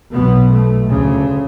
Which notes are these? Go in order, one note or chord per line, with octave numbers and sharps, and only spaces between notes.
B1 B2 B3
A3
D2 C#3